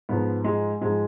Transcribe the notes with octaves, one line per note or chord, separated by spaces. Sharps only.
G#2 F3 B3
G#3
G#2 F3 G#3